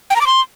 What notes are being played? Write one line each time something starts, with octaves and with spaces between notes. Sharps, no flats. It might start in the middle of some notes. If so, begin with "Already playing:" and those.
G5
A#5
D6
C6